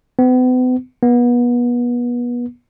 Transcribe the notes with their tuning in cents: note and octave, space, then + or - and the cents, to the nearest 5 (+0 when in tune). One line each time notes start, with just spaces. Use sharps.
B3 +40
B3 -30